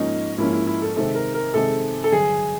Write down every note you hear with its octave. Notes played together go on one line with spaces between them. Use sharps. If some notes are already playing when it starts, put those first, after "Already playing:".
Already playing: G#2 F3 A#3 C#4 D#4
G#2 F3 A#3 C#4 E4
E4
E4
A4
C3 D#3 G#3 C4 A4
A#4
A#4
C3 D#3 G#3 C4 A4
A4
G2 D3 F#3 G#4